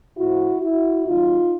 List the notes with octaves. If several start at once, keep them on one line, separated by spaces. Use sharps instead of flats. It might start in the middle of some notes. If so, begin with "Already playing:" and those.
A2 F3 E4 F#4
E4 F#4
D#2 C#3 F#3 D#4 F4